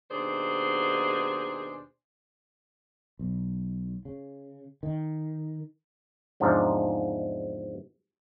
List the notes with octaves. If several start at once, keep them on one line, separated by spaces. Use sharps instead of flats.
D#2 B2 D#3 D4 G#4 C5
B1
C#3
D#3
E2 G#2 C3 F3 D4 D#4